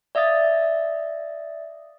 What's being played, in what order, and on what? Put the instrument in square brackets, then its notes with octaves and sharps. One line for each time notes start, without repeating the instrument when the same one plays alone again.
[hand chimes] D5 E5 F5 D#6 A6